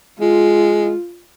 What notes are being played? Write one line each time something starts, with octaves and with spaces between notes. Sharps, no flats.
G#3 F4